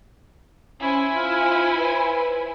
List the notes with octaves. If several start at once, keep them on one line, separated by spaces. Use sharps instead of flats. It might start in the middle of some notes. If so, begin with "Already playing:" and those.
C#4 E4 C5 G#5
F4
B4